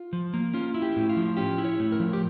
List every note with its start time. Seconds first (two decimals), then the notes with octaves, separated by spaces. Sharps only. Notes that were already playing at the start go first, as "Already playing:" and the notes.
Already playing: F4
0.13 F3
0.34 A#3
0.53 C#4 F4
0.74 E4
0.82 G4
0.96 A2
1.09 F4
1.17 F3
1.37 C#4 G4
1.58 E4
1.65 C#5
1.79 A2
1.92 A#4
2.00 F3
2.13 G4